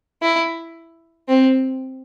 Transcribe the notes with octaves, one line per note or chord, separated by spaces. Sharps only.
E4
C4